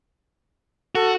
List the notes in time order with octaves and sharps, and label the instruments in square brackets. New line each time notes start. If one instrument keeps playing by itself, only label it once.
[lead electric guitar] F#4 [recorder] A4